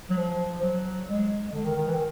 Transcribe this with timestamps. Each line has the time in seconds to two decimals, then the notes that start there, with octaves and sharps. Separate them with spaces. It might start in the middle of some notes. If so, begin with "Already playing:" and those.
0.10 F#3
0.17 F3
0.62 F#3
1.08 G#3
1.53 D3
1.65 D#3
1.76 D#3
1.87 E3
1.95 D#3